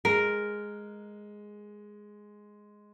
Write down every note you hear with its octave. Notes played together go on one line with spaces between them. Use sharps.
G#3 A#4